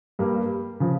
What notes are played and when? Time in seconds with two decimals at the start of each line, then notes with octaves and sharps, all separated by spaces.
0.19 G2 G3 A#3
0.80 C#3 F3